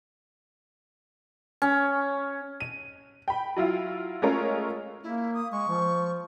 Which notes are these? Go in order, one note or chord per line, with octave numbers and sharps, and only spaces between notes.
C#4
D#7
G5 B5
F#3 E4 F4
G#3 A3 C#4 F4 A#4 C#5
A#3 E4
D#6
G#3 C#6
F3